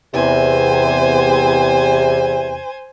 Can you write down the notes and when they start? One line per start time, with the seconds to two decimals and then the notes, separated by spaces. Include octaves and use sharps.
0.14 E2 C3 C5 G#5